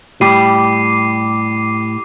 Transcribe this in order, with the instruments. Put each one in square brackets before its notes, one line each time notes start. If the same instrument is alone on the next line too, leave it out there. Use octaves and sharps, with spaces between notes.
[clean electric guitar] A2 [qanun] G3 [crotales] D6 C7 D#7